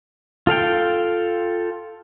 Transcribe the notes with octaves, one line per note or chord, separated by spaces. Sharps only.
F4 A4 F5 G5